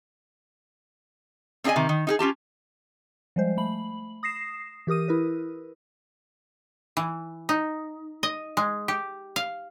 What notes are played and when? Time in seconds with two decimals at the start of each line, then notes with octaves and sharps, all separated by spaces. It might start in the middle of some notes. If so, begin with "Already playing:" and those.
1.64 C4 D4 G#4 D5 D#5 G#5
1.76 C3 D#3
1.89 D#3
2.07 D#4 G4 G#4
2.19 C#4 F4 G4 A5
3.36 F3 G3 G#3 C5
3.57 A3 B5 F#7
4.23 D#6 A#6 C7 E7
4.87 E3 G4 A#4 D#6 D#7
5.08 E4 A#4 B4
6.97 E3
7.49 D#4
8.23 D#5
8.57 G#3
8.88 G4
9.36 F5